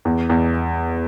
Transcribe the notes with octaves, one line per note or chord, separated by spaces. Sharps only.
E2
E2